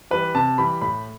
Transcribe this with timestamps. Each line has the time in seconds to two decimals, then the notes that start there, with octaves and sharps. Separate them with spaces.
0.11 E3 G3 B4
0.35 C3 A5
0.58 E3 G3 B5
0.81 A2 B5